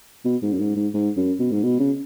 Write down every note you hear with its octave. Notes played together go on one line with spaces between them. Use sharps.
B2
G#2
F#2
G#2
G#2
G#2
F#2
B2
G#2
B2
C#3